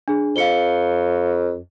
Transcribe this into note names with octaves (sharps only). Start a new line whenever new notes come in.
D4 G#4
F2 F5 C#7 G7